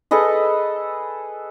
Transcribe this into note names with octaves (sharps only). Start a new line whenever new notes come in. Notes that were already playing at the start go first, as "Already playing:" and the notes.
G#4 A4 B4 D#5